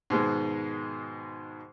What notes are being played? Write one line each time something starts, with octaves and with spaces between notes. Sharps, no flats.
G#2 B2 D#3 G#3